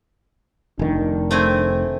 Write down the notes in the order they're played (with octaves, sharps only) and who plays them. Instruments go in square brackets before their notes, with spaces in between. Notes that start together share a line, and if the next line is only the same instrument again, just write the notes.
[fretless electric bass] F1 D#3 [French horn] D4
[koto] A3 C4 G#5